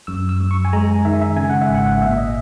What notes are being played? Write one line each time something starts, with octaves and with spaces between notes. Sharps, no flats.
F#2 E6
E6
F#2
C#6
G#5
G#3 A#5
G#5
D#3 E5
E5
C#3 G#5
F#5
E5
G#1
F#5
A#2 E5
D#5